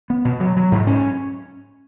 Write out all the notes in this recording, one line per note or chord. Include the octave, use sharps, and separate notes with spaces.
B3
B2
F#3
F#3
G#2
C#4